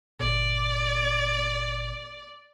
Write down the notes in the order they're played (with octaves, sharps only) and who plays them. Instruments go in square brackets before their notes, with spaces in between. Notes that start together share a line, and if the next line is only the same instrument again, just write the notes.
[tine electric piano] G1 A#2 [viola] D5